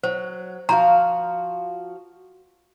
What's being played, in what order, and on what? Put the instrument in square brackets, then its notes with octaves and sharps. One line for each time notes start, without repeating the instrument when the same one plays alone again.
[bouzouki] F#3 [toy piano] C5
[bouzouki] F3 F#4 F5 [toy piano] A#5